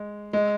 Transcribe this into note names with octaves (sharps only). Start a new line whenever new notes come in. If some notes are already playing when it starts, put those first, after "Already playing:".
Already playing: G#3
G#3